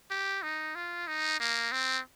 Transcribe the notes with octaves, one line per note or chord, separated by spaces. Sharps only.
G4
D#4
F4
D#4
A#3
C4